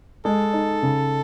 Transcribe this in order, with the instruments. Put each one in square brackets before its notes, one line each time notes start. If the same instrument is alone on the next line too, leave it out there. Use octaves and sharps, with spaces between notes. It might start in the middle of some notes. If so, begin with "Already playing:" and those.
[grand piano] G#3 [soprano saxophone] A4
[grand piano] D#4
C#3